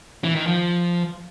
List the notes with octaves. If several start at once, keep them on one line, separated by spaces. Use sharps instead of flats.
E3
D#3
F3